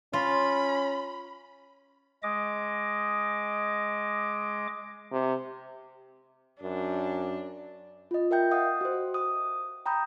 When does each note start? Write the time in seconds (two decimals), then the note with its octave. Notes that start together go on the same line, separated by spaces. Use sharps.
0.13 C#4 F4 B5
2.23 G#3 D#5 D6
5.12 C3
6.62 F#2 D4
8.11 F4 D#5
8.31 A#4 E5 G5 G6
8.51 D#5 F5 F#5 D#6
8.81 F#4 C5
9.14 D#6
9.86 G5 A#5 B5 D#6 G6